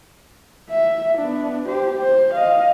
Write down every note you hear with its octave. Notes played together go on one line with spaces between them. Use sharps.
E5
B3 D4
G4 C5
C5
D#5 F5